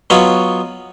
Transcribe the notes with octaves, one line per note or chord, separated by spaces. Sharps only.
F#3 B3 F4 C#5 D#5